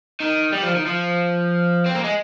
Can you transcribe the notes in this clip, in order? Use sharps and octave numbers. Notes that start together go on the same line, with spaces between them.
D#3
G3
F3
D#3
F3
C4
A#3
G#3